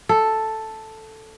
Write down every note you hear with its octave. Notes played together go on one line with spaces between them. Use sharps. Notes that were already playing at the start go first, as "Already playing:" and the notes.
A4